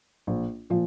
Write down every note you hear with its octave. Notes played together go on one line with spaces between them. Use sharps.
A#1
A#2 F3